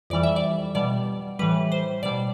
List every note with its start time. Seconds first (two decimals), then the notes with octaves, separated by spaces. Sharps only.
0.10 F2 E3 G3 D5
0.23 E5
0.36 D5
0.75 B2 G3 D5
1.39 A2 E3 G3 B4
1.72 C5
2.03 B2 G3 D5